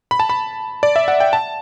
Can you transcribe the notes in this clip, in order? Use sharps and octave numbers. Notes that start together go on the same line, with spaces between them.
B5
A5
B5
D5
E5
F#5
G5
A5